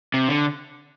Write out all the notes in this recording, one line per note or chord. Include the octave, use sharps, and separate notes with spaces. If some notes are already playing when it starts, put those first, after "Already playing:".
C3
D3